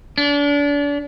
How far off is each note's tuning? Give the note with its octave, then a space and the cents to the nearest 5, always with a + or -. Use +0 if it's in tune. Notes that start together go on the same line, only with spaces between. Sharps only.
D4 -35